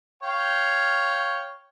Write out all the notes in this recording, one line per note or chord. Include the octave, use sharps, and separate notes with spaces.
C#5 F5 G5